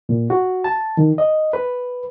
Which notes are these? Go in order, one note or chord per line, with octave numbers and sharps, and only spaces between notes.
A#2
F#4
A5
D#3
D#5
B4